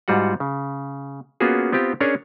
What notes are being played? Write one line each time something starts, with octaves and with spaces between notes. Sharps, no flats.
G#2 G3 F4 F#4 F#5
C#3
A#3 B3 C#4 F4 F#4 G#4
B3 C4 F4 G4
C#4 D4 G#4 A#4 C#5